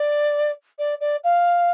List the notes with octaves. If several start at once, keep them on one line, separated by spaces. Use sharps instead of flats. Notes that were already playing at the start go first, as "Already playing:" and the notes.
Already playing: D5
D5
D5
F5